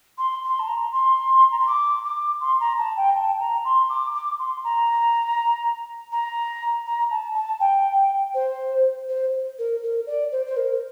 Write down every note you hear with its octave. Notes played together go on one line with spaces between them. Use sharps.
C6
C6
A5
A#5
C6
A#5
C6
D6
D6
C6
A#5
A5
G5
A5
A#5
C6
D6
D6
C6
A#5
A#5
A#5
A5
A5
G5
C5
C5
A#4
A#4
D5
C5
C5
A#4